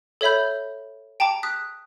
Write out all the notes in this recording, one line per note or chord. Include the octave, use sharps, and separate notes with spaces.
A4 C#5 E5 B5 G6
G5 A5 A#5 D6
D#6 F#6 B6